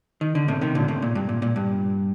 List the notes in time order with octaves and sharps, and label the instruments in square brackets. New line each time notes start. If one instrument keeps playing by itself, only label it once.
[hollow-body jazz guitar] D#3
D3
A2 C3
C3 D#3
A#2 D3
A2 C3
A#2
G2
A#2
A#2
G2